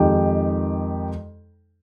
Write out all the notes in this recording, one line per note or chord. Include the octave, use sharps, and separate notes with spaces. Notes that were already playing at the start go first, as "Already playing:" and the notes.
Already playing: F2 D#3 G#3 D#4 G4